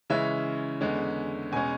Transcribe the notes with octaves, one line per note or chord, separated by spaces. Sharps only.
C#3 E3 G#3 C#4 E5
E2 D3 G#3 C#4
E2 B2 G#3 C#4 G#5